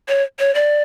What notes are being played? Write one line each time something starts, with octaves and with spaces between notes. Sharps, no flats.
C#5
C#5
D5